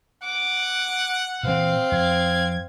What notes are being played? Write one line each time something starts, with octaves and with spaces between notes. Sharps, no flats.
F#5 D6
A#2 E3 C4 F5
F2 G#6